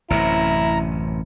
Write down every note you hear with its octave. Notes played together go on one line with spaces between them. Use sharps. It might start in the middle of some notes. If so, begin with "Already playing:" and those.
A1 F#2 C3 E4 A#5